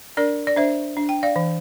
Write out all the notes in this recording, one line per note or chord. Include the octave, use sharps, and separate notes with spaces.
D4 A#4 D5
D5
D4 C5 E5
D4
G5
D5 F5
E3